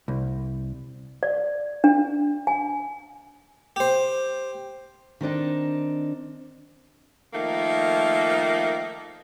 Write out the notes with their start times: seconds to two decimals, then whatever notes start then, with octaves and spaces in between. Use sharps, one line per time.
0.08 C2
1.23 D5
1.84 D4
2.47 G#5
3.76 G4 C5
5.21 D#3 C4 D4 D#4
7.33 D#3 F3 A3 A#3